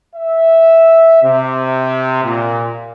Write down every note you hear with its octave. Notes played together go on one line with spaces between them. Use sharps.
E5
C3
A#2